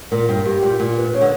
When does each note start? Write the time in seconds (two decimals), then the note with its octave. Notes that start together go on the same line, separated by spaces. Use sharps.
0.11 A#2 A#4
0.29 G2
0.45 G2 G4
0.62 A#2
0.80 A#2
0.97 B4
1.13 C#3 C#5
1.21 D3